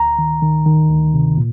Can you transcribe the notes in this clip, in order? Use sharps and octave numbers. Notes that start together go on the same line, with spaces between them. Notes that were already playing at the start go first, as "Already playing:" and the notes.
Already playing: D2 A#5
D#3
D#3
D#3
D2
C3
A#2